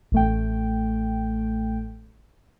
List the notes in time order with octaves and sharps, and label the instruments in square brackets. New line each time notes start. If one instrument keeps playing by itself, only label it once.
[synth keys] A1 A3 G5